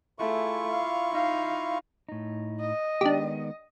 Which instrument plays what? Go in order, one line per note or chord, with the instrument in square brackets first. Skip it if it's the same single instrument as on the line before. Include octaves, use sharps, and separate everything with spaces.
[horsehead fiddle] A3 G#4 [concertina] E4 F4 C#6
[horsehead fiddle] F5
D#4 F5
[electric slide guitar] A2 D#4
[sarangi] D#5
[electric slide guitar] D#3 G#3 B3 [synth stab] D4 G4